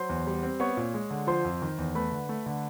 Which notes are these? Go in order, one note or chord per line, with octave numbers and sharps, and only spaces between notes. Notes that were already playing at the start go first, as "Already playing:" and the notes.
Already playing: F#3 C5 C6
E2
G3
C4
B3 C#5 C#6
A#2
G#3
D3
F3 C5 C6
F2
D#3
E2
A3 B4 B5
D3
A3
D3